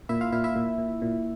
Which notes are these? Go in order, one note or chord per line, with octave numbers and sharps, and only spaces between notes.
A#2 E4 E5
F4 F5
A#2 E4 E5
E4 E5
A#2
A#2
A#2